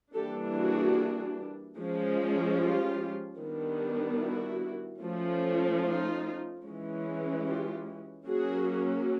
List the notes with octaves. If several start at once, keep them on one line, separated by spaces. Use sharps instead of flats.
E3 G3 A#3 D4 G4 A4
F#4 G#4
F3 G#3 C#4
F4 G4
D#3 G3 B3 D4
E4 F#4
F3 A3 C#4
D#4 F4
E3 G#3 C#4
F4 G4
F#3 A#3 C#4 F#4 G#4